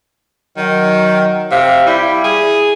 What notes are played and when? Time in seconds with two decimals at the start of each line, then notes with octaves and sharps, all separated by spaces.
0.57 D#3 F#3
1.52 C3 F5
1.87 G3 E4
2.24 G#4